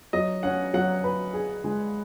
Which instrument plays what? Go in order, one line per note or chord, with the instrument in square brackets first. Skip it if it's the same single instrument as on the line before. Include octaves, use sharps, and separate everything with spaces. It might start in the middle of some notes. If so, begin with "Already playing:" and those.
[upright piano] F#3 [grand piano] D#5
[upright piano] C#4 [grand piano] F#5
[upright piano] F#3 [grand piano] F#5
[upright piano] B4
G#4
G#3